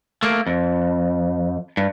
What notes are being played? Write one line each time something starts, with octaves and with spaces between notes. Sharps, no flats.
A3 A#3
F2
G2